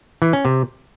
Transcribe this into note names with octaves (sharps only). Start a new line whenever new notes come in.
E3
C#4
C3